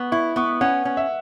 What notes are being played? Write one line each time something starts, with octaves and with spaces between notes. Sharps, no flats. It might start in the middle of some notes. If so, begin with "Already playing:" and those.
Already playing: B3 C#6
E4 C#6
B3 C#6
C#4 F#5
C#4
E5